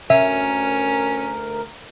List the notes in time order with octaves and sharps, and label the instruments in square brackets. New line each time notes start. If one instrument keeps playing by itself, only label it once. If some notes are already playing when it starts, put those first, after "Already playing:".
[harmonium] D2 A#4 [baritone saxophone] C#4 [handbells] E5